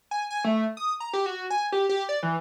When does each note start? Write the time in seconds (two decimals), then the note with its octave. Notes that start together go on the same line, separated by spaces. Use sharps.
0.11 G#5
0.31 G#5
0.44 A3
0.77 D#6
1.00 A#5
1.13 G4
1.26 F#4
1.50 G#5
1.72 G4
1.89 G4
2.09 D5
2.23 E3